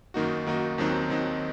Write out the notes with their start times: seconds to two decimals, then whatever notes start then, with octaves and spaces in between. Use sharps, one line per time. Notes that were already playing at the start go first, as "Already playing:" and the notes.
0.14 F#2 D#3 A#3 D#4 F#4
0.46 F#2 D#3 A#3 D#4 F#4
0.78 D#2 D#3 F#3 C4 D#4
1.10 D#2 D#3 F#3 C4 D#4